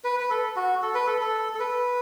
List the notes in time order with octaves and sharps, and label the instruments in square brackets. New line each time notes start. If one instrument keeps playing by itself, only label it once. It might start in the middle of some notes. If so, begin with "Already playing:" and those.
[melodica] B4
B4
A4
F#4
A4
B4
A4
A4
A4
B4